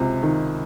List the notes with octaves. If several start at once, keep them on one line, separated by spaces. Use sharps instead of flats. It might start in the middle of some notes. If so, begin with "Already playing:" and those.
Already playing: C#2 C3
D#3